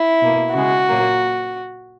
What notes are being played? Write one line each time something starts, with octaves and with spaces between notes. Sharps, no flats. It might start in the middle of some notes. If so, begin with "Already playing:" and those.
Already playing: E4
B2 A#3
C#3 G#3 F#4
A#2 F#3 A#3